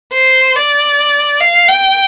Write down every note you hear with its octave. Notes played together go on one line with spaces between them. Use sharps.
C5
D5
F5
G5